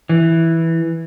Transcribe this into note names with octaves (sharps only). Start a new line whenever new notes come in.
E3